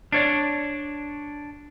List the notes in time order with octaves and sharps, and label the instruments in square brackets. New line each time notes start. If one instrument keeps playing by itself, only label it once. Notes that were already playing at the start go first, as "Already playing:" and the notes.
[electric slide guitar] D4 C#5 D5